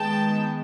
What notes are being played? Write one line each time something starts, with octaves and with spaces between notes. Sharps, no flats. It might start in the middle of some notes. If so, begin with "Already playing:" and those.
Already playing: D#3 G#3 B3 G5 A5